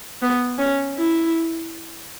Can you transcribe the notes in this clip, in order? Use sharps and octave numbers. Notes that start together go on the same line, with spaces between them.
B3
C#4
E4